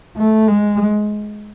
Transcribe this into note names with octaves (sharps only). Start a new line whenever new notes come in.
A3
G#3